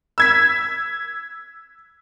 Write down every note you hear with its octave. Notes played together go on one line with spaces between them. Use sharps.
E6 G#6 B6